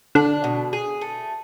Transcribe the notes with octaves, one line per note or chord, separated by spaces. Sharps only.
D3 D4
B2
G#4
A3